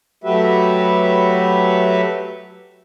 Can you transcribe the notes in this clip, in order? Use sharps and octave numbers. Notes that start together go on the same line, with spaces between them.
F#3 A3 F#4 G4 B4 E5